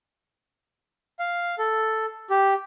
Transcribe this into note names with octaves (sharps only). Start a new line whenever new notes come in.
F5
A4
G4